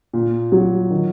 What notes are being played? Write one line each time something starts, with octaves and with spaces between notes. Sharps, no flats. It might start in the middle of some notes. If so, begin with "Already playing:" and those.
A#2
F#3
D#3